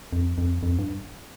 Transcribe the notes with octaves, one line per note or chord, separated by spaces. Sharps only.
F2
F2
F2
G2